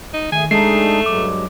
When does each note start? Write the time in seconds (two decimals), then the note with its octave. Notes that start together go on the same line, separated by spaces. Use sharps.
0.14 D#4
0.32 D#3 A3 G#4 G#5
0.51 G#3 A3 D4 D#4 G#4 C7
1.06 G2 F#3 G#3 D6